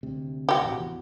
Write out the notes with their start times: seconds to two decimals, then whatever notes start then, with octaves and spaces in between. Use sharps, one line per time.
0.03 D2 C3
0.49 F#4 G4
0.63 A1 C3
0.79 E2